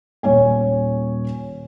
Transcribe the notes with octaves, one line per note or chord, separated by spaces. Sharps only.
D#1 C#5 G#5